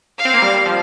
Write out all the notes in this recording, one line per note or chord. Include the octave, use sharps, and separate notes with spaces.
F5
C4
A#3
G3
F3